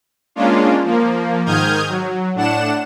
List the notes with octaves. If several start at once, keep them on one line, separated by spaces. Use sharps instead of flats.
G#3 A#3 C#4 D4 F4
F3 A#3
G#2 D#3 D#6 F6 G6 G#6
F#3
A2 D4 F#5 E7